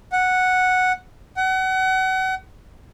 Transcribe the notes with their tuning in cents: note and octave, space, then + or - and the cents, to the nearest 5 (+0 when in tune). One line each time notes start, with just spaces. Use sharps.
F#5 -5
F#5 +30